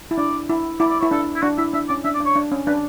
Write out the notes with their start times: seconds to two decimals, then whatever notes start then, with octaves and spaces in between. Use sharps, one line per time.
0.11 E4
0.18 D4 D5
0.50 E4
0.80 E4 D5
0.91 D5
1.00 E4 C#5
1.11 D4 A4
1.35 E4
1.42 D4 F#4
1.58 E4 E5
1.74 D4 E5
1.89 C#4 D5
2.04 D4 E5
2.15 D5
2.20 D4
2.25 C#5
2.36 D4
2.52 C#4
2.67 D4 B4